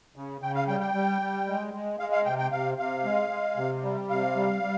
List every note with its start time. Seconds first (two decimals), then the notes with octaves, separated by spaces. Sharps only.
0.16 C#3
0.41 C#3 G5
0.55 F5
0.68 G3 G5
0.81 G5
0.94 G3
1.21 G3
1.47 G#3
1.74 G#3
1.99 G#3 F5
2.12 F5
2.25 C3 G5
2.38 G5
2.52 C3 F5
2.78 C3 F5
3.04 G#3
3.30 G#3
3.57 C3
3.83 G3
4.10 C3 F5
4.35 G3
4.62 G3